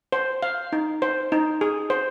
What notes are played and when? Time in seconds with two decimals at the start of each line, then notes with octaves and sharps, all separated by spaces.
0.12 C5
0.43 F5
0.73 D#4
1.02 C5
1.32 D#4
1.61 G#4
1.90 C5